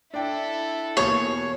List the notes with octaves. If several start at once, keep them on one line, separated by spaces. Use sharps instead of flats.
D4 E4 A4 G5
E2 B2 A#3 C#5 C#6